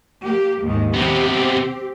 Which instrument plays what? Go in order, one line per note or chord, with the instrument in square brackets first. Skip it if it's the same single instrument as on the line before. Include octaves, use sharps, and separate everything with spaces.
[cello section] A#3 G4
D#2 G#2 D#3
[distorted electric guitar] C3 B3 [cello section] C4 G4